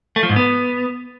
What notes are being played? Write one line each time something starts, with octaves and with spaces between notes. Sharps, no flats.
A3
F3
G#2
B3